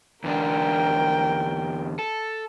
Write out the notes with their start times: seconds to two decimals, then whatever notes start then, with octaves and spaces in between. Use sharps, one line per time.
0.24 E2 D3 D4 A#4 G5
1.99 A4